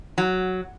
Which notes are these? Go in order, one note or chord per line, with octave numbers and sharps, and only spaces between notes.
F#3